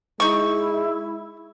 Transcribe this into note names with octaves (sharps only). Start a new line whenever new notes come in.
G#3 D#4 E4 C#6